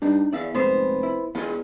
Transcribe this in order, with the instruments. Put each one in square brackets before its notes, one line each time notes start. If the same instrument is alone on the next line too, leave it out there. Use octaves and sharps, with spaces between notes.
[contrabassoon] G2 [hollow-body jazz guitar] D4 D#4
[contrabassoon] E2 [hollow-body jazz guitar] D5 E5 F5
[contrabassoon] F1 [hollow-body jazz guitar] G#2 [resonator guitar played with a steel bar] B3 C5
[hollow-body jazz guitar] E4
[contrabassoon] E2 [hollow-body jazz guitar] B3 G#4 D#5 [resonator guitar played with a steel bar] F4